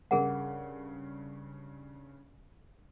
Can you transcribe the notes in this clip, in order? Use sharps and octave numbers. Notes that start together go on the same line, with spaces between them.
G2 C#3 G#4 A#4 F#5